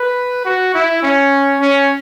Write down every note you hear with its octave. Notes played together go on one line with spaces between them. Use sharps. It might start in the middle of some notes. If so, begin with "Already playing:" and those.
Already playing: B4
F#4
E4
C#4
C#4